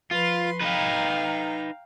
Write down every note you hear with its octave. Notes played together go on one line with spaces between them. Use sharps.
F3 F4 B4 C6
D#4 B4 F5 G5 A#5